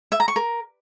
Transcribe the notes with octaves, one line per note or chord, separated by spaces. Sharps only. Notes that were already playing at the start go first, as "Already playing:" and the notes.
E5
A#5
C#6
A#4